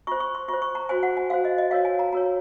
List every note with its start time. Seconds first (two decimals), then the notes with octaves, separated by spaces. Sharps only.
0.07 F4 C5 C#6
0.20 C#6
0.35 C6
0.48 F4 C#6
0.53 C5
0.62 C#6
0.75 A#5
0.89 F#4 C5 G#5
1.03 F#5
1.17 G#5
1.30 F#4 C5 F5
1.45 D#5
1.58 D#5
1.71 F#4 A#4 C#5 F5
1.85 G#5
1.99 A#5
2.12 F#4 A#4 C#5 A#5